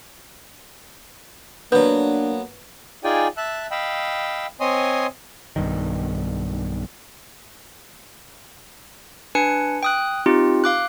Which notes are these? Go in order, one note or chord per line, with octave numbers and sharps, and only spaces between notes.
F#3 A#3 B3 D4 B4
D#4 F4 G#4 D5 G5 G#5
E5 A5 E6 F#6
D#5 F5 G5 B5 E6
C4 C#5 D#5 G#5 C6 D#6
B1 G2 D#3
D4 B4 G#5 C#7
G5 D#6 F#6
C4 D#4 F4 G4
F5 D6 F#6